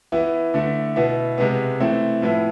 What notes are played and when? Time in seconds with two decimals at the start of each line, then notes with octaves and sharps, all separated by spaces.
0.12 E3 B3 E4
0.54 D3 A3 E4
0.96 B2 B3 E4
1.38 C3 G#3 B3
1.80 E3 A3 C4
2.22 A2 F3 B3 E4